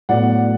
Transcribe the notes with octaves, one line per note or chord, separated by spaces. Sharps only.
A2 F#3 B3 D5 F#5